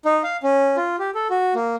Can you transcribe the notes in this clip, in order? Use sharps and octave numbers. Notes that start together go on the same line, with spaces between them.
D#4
F5
C#4
F4
G4
A4
F#4
A#3